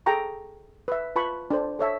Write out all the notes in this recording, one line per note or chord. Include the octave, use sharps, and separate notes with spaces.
G#4 A4 G5 A#5 C#6
B4 E5
F4 B4 A5 B5 C#6
D4 A4 C5
A4 C#5 E5 A5